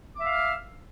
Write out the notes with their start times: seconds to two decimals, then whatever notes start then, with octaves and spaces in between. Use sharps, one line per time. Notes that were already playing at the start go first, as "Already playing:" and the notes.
0.15 D6
0.19 E5
0.24 F5
0.29 F6